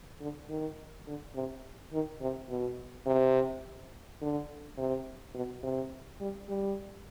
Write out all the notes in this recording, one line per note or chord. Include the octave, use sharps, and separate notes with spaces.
D3
D#3
D3
C3
D#3
C3
B2
C3
D3
C3
B2
C3
G3
G3